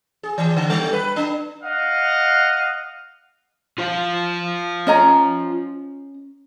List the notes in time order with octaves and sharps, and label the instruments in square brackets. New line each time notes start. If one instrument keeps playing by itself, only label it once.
[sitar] G#4
E3
D3
G3
B4
D4
[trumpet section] D#5 F5 F#5
[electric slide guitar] F4 C5 F5
[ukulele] C#4 D#5 A#5